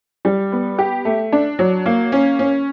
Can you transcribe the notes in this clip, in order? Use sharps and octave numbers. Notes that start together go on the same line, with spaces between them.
G3
B3
G4
A3
D4
F#3
A#3
C#4
C#4